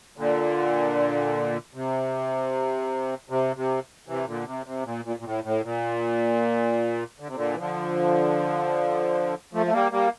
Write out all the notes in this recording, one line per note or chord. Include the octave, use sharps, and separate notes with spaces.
A#2 D3
C3
C3
C3
C3 E3
A#2 D3
C3
C3
A#2
A#2
A#2
A2
A2
A#2
D3
C3
A#2 D3
E3
D3 F3
F3 A3
A3
G3 A#3
G3 A#3